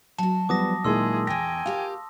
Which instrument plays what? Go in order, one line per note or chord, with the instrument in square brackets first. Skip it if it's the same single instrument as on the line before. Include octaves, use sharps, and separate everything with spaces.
[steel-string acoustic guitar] F#3 F#4 [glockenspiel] A5
[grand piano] F3 G3 B3 [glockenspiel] D6 D#6 A#6
[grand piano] A#2 D#3 G#3 [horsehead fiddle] E4 G#4 [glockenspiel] C6 E6
[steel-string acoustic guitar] E2 B3 [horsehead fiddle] G5 G#5 [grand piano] A#6
[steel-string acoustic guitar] F4 G4 A#4 [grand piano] F5